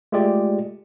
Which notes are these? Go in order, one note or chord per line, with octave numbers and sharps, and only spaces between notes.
G#3 A3 F4 G4 G#4 D5